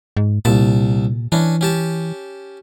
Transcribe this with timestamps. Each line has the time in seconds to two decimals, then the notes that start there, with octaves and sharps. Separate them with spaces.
0.17 G#2
0.45 C2 A#2 A5
1.32 E3 C#4 D4
1.61 C#4 G4 A5